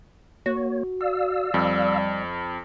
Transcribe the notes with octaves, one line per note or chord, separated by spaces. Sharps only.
A#3 F#4 C#5
D5 F5 E6
F2 G3